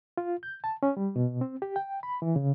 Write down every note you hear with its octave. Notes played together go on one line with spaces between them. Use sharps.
F4
G6
A5
C#4
G3
B2
C4
G4
G5
B5
E3
C#3